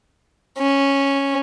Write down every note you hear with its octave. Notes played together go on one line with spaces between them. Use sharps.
C#4